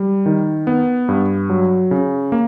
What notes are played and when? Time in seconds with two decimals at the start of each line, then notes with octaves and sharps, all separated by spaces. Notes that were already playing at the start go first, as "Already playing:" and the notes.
Already playing: G3
0.26 D#3
0.67 B3
1.09 G2
1.50 F#3
1.91 C#3
2.32 A#3